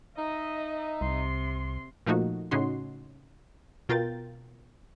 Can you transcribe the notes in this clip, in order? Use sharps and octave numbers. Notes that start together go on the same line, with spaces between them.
D#4 D#5 E5
C2 C3 C6
A#2 F3 A3 A#3 D#4 F#4
A2 C#3 C#4 D#4 F#4 C6
B2 F4 A#4 G5 A6